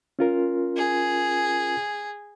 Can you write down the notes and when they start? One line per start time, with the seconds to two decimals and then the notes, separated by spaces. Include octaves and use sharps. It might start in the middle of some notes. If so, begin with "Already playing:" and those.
0.19 C#4 F4 A#4
0.77 G#4